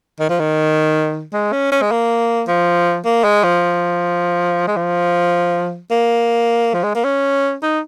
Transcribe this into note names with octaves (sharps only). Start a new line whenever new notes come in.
D#3
F3
D#3
G#3
C#4
C#4
G#3
A#3
F3
A#3
G#3
F3
G#3
F3
A#3
F3
G#3
A#3
C#4
D#4